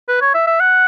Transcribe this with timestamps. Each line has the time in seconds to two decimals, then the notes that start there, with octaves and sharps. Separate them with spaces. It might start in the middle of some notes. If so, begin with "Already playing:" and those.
0.08 B4
0.21 C#5
0.34 E5
0.47 E5
0.60 F#5